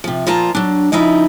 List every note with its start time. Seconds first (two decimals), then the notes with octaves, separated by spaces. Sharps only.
0.04 C3 F3
0.26 A#2 F3 F4 A5 A#5
0.55 F#3 D4
0.92 C#3 F3 D#4 E4